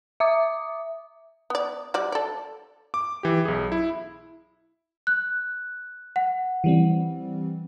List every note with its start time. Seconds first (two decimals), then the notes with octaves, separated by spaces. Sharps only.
0.20 E5 D6 D#6
1.50 B3 D5
1.94 G3 F#4 D5
2.12 A4 D5
2.94 D6
3.23 E3 G4
3.45 B1 G#4
3.72 E4
5.07 F#6
6.16 F#5
6.64 E3 G3 C4